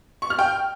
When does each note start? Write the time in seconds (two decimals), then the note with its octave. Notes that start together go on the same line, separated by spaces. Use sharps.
0.22 C#6
0.30 F6
0.39 G5